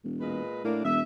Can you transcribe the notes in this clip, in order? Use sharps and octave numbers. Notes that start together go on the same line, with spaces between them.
E1
A#2 G#3 B4
A2 A#3 D4
E1 E5